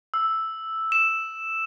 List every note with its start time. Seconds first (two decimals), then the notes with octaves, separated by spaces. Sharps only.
0.14 E6
0.92 E7